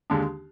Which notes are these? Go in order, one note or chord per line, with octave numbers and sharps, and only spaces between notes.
D#2 D3 G#3 D4